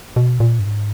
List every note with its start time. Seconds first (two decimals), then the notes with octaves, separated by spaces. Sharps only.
0.16 B2
0.40 A#2
0.59 G2
0.66 G#2